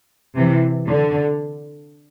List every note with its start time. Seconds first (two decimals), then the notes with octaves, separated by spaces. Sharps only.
0.36 C3 E3
0.87 D3